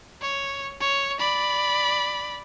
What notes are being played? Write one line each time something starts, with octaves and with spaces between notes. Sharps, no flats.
C#5
C#5
D5 B5